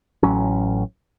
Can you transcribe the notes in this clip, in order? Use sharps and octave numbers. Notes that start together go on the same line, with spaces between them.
A1 A2 F#3 C#4